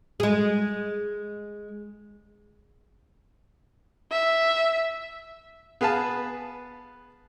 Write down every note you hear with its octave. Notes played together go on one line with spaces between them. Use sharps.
G#3 G#4
E5
B3 G#4 B4 F5 A5